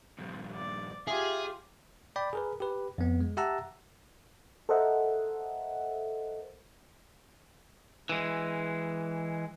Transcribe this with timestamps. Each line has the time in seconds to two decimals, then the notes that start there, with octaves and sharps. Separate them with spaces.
0.18 G2 A#2 F3
0.54 D5
1.07 F4 G4 G#4 E5
2.16 D5 G5 B5
2.33 G#4 A#4 B4
2.60 G4 B4
2.98 F2 B3
3.20 G#3
3.37 G4 E5 F#5 A5 A#5 E6
4.69 A4 A#4 C5 D#5 E5 F#5
8.09 E3 G#3